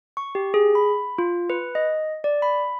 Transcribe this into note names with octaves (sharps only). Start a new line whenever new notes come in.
C#6
G4
G#4
B5
F4
B4
D#5
D5
B5